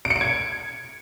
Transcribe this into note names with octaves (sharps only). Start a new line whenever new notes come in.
D7
C#7
D7
G#6